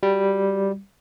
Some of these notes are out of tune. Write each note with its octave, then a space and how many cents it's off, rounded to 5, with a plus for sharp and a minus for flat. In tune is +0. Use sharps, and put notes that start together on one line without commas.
G3 +0 F#4 +0